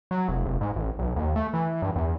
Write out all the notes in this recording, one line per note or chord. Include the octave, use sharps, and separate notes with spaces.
F#3
F1
F1
G#2
A1
B1
D#2
A3
E3
G2
E2